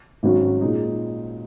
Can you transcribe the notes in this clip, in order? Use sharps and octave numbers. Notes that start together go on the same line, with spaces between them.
G#1 G#2 F#3 C#4 F#4
A#2 G#3 D#4